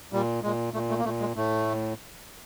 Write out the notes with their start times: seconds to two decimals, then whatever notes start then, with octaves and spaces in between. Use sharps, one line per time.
0.13 A#2 G3
0.43 A#2 G#3
0.74 A#2 A3
0.90 A3
0.99 A#3
1.05 A#2 A3
1.20 G#3
1.36 A2 A3